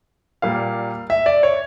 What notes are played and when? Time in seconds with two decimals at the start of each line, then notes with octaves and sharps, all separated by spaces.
0.42 A#2 G3 A#3 F5
1.10 E5
1.26 D5
1.43 C#5